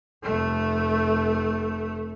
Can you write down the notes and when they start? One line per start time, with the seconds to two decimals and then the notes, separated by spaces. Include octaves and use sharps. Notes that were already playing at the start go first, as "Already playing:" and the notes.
0.23 F1 A3